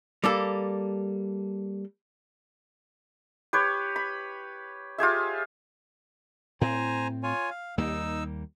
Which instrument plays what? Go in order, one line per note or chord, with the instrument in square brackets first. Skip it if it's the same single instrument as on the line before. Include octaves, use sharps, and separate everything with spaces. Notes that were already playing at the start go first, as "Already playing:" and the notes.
[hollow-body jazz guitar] G3 A#3 A4
[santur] G4 B4 C#5
B5
F4 G4 G#4 E5
[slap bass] A2 C4 [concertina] C5 G#5 A#5
[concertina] F4 C#5 G#5
F5
[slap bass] D#2 G3 A#3 [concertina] D#4 E6